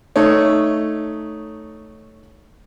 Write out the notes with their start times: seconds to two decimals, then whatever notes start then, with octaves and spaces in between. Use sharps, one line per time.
0.16 A3 D#4 C#5